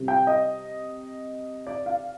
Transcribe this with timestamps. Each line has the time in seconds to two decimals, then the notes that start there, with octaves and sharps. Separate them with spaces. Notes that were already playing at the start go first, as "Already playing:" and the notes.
Already playing: C3 G3
0.08 G5
0.27 D#5
1.67 D5
1.86 F5